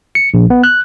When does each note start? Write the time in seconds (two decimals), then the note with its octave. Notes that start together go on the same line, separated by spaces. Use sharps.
0.15 C#7
0.34 A#1
0.50 B3
0.63 F#6